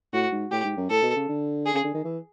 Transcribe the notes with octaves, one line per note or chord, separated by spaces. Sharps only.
A2 F#4
G#2
A2 G4
G#2
F#2
A2 A4
B2
C#3
D3
G#4
C#3
D3
D#3
E3